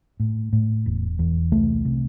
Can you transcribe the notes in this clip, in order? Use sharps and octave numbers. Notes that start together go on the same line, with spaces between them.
A2
A2
E1
E2
C2 A3
C3